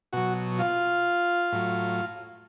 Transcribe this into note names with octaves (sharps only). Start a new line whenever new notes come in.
B2 F#3 F#4 F#5
F4 F5
A2 F#3